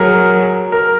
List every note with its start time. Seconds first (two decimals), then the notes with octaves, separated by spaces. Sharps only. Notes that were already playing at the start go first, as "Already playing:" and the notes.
Already playing: F#3 G#4 A#4
0.72 A#4